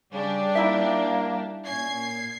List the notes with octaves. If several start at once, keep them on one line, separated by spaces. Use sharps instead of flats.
C#3 G3 D4 G4
A#3 D#4 E4 E5
A#2 C#4 G#6 C7